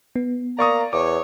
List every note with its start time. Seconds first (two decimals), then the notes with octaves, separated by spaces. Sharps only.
0.16 B3
0.59 A#3 D5 A#5 C#6 D#6
0.93 E2 C#5 D6